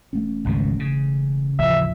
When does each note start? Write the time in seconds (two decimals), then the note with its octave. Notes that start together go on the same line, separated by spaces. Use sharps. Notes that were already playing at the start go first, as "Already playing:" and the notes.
0.13 E1 A3 C#4
0.45 G#1 C#2 B2
0.79 C#3
1.59 A1 D#2 F3 E5